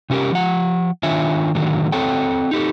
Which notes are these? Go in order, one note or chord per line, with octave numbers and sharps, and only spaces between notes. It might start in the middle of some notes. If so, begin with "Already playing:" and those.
C3 C#4 F#4 G4 A#4
F3 F#5
D#3 D4 F4 C#5 E5 G#5
A2 D3 D#3 F#3
C4 A4 C#5 G5
D#4 G4 A4